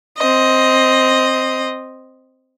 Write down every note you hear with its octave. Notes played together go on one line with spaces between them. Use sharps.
C4 D#5